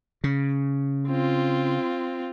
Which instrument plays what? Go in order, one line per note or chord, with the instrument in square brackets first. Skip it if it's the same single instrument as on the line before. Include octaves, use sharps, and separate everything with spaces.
[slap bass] C#3
[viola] C4 F4